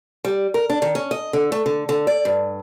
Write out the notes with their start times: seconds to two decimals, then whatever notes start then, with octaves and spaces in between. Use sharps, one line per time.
0.25 G3
0.54 A#4
0.70 D4
0.82 D#3
0.95 C#4
1.11 D#5
1.33 D3
1.52 A3
1.66 D3
1.89 D3
2.07 D5
2.25 G2